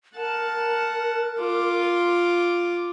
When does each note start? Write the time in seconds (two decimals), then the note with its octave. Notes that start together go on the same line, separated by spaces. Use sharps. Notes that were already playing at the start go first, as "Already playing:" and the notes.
0.16 A#4 F#5 A5
1.40 F4 D6